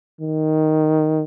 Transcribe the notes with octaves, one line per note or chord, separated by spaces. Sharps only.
D#3